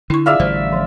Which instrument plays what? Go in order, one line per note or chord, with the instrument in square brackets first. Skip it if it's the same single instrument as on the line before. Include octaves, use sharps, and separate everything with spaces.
[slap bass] D3 [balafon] E4 C#6
[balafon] F4 G#4 [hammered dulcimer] D5 E5 F5
[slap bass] A1 D3 G3 [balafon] C5
[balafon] F3